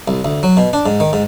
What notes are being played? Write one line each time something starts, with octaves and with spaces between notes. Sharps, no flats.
C2
D2
F#3
B2
D4
G#2
D#3
G#2